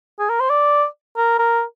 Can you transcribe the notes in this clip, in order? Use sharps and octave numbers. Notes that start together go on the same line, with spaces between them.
G#4
A#4
C5
D5
A#4
A#4